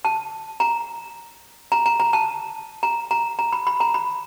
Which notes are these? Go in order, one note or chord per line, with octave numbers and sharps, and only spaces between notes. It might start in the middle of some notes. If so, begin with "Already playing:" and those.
A5
A#5
A#5
A#5
A#5
A5
A#5
A#5
A#5
B5
B5
A#5
B5